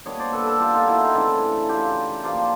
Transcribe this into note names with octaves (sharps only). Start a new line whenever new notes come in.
A#2 G3 B3 D4 C#5 D#5
C5 D5
A4 B4
A4 B4
F4 G4
D#4 F4
E4 F#4
D#4 F4
C#3 E3 A3 C4 D4 E4
F4 G4
F3 A#3 D4 F4 G4